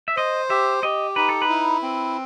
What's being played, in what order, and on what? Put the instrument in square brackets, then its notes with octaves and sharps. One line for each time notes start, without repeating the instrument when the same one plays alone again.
[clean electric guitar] E5
[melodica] C5 [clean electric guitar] D#5
[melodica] G4 [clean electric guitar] E5
[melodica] G4 [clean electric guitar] D#5
[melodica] D#4 [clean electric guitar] B4
[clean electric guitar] A4
B4
[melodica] E4
C4